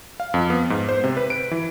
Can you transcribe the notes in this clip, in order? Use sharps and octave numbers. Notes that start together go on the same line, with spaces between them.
F5
F2
B3
G#2
C5
C3
B4
D7
E3